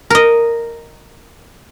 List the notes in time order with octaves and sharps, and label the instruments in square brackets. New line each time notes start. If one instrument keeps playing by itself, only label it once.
[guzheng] A#4 D#5